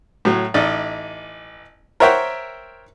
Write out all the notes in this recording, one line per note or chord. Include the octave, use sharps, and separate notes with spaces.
A2 F#3
A1 D#4 D5
A#4 C5 C#5 E5 F#5 G5